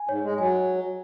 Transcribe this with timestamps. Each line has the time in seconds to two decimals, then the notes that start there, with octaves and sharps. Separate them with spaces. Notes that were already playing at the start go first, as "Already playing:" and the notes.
Already playing: G#5
0.09 G#2 C#5
0.24 G#3
0.38 F#3 G#5